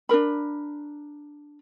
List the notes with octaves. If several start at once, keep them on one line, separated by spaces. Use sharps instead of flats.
D4 D#4 A#4 B5